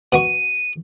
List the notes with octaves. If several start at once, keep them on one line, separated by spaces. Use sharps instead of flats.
B2 B3 C#6 D#7